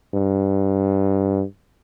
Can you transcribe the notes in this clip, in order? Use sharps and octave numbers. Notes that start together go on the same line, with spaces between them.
G2